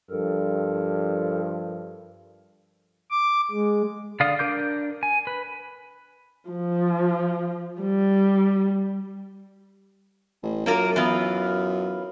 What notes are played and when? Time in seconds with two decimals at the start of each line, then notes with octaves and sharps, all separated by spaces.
0.10 G2 F3 A4 A#4
3.11 D6
3.51 G#3
4.20 D3 D5 F5 D#6
4.39 D4 A#4 D6 G6
5.03 G#5
5.27 B4
6.50 F3
7.82 G3
10.43 A1
10.66 F#2 A#3 F4 A#4
10.96 E3 B3 F4